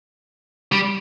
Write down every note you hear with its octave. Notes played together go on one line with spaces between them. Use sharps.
G3